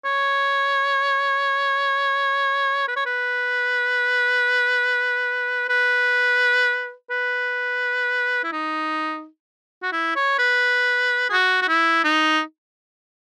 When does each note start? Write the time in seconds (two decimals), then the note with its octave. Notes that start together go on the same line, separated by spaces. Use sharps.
0.05 C#5
2.88 B4
2.96 C#5
3.06 B4
5.69 B4
7.10 B4
8.44 E4
8.52 D#4
9.82 F#4
9.92 E4
10.16 C#5
10.39 B4
11.29 G#4
11.33 F#4
11.62 F#4
11.68 E4
12.04 D#4